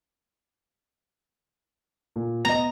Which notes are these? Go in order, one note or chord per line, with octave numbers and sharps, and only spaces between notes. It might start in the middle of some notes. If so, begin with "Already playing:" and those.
A#2
B3 D#5 A#5